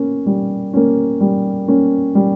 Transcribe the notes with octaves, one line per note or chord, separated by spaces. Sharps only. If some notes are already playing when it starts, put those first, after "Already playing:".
Already playing: A#3 C#4
G3
A#3 C#4
G3
A#3 C#4
G3